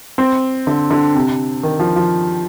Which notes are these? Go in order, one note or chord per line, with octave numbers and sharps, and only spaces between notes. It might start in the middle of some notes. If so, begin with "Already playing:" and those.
C4
D3
D3
C3
D#3
F3
F3